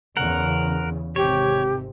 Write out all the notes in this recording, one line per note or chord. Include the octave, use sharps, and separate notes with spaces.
E2 C#3 A#4 F#5
G#1 C3 G4 C#5